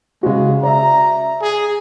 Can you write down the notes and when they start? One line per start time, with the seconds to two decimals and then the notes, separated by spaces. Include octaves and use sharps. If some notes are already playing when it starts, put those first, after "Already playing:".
0.23 C#3 G#3 F#4
0.63 D5 E5 A#5
1.41 G#4